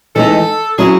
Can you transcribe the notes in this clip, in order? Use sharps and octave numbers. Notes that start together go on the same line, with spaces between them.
E3 G#3 D#4 A4
F#3 C#4 E4 G#4